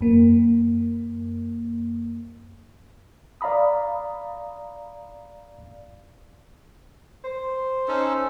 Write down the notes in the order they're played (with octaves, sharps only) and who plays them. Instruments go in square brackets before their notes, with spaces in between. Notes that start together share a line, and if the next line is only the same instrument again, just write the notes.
[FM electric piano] F#2 A#3
[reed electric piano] D5 F5 A#5 B5 D#6
[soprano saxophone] C5
[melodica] C#4 D#4 A4